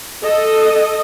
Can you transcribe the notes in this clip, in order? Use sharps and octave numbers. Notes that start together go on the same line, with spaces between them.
A4 D#5